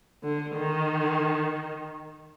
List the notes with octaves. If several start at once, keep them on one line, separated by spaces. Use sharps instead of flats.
D3
D#3